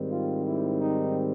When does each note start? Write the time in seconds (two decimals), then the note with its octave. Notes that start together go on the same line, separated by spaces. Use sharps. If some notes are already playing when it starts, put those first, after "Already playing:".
Already playing: G#2 D#3 G3 C4
0.11 F4
0.46 E4
0.80 D#4